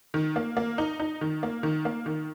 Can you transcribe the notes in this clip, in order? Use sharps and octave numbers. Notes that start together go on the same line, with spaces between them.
D#3
A#3
A#3
D#4
D#4
D#3
A#3
D#3
A#3
D#3